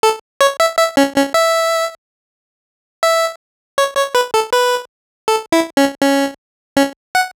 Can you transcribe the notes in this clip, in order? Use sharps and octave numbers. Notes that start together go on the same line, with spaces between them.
A4
C#5
E5
E5
C#4
C#4
E5
E5
C#5
C#5
B4
A4
B4
A4
E4
C#4
C#4
C#4
F#5